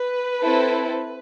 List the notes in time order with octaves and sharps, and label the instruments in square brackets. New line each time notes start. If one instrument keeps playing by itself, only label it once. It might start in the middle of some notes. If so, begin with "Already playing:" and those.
Already playing: [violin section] B4
C4 E4 A4